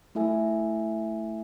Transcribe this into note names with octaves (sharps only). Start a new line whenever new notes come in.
A3 E4 A4 E5 G#5